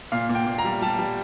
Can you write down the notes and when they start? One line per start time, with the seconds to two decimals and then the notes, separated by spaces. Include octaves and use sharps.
0.12 A#2 F5
0.29 A#2
0.35 G5
0.47 A#2
0.59 A#5
0.65 G3
0.82 G3 A5
0.99 G3